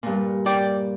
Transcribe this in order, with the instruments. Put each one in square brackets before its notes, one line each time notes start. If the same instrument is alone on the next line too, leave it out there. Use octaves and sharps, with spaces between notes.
[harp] G2 A#2
[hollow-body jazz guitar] D5 G5